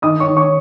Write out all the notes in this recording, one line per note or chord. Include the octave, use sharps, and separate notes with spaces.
D#3 D#5 D#6
C#5 C#6
D#3
C#5 C#6